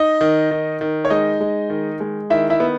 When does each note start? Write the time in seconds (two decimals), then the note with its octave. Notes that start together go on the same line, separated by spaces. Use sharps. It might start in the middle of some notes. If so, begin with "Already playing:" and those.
Already playing: D#4 D#5
0.21 D#3
0.51 D#3
0.81 D#3
1.05 C#5
1.10 G#3 D#4 D#5
1.40 G#3
1.70 D#3
2.00 G#3
2.30 D#3 E4 E5
2.50 E4 E5
2.60 B3